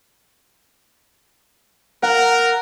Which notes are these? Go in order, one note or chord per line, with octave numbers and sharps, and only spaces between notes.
A#4 F#5